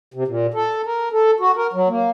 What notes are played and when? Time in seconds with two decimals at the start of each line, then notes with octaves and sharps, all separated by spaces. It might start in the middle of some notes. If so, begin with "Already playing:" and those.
0.14 C3
0.28 A#2
0.54 A4
0.86 A#4
1.12 A4
1.40 F#4
1.56 A#4
1.73 F#3
1.88 A#3